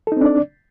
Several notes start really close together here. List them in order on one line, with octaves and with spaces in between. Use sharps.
A4 D#4 C4 D4 D5